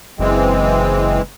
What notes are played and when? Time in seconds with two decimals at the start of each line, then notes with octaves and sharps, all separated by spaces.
0.19 F#1 E3 G#3 C4